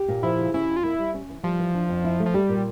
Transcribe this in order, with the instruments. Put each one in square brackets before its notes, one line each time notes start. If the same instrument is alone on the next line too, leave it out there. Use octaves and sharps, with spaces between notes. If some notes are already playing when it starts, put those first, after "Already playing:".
Already playing: [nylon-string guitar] G4
A#2
[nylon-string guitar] F3 [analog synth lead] E4
[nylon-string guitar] C#3
[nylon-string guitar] C#4 [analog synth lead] E4
[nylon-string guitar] F2
[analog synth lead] F4
[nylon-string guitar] A#3 [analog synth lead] E4
[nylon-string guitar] G3
C#4
E3
[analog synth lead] F3 [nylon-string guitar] G3
[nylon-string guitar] E3
D4
F2
E4
A3
[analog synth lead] F3
[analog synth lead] G3 [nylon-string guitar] G4
[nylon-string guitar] A#2